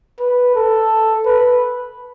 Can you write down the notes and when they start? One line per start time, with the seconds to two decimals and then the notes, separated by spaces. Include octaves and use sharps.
0.19 B4
0.55 A4
1.25 B4